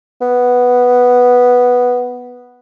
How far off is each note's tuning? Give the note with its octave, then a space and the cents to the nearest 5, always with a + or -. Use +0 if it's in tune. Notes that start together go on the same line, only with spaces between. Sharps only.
B3 +0